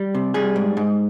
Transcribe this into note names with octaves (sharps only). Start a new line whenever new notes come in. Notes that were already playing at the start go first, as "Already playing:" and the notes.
Already playing: G3 G4
C3
G3 G#4
G#2
G#2